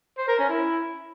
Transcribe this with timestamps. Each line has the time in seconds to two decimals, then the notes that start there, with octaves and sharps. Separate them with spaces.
0.18 C5
0.28 A#4
0.39 C#4
0.49 E4